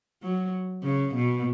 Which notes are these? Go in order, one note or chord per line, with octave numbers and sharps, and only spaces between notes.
F#3
C#3
B2